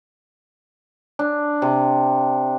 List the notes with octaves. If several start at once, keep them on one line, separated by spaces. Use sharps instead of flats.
D4
C3